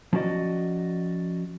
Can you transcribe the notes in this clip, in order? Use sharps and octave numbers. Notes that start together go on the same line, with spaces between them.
F3 C#4 F#4 D5 D#5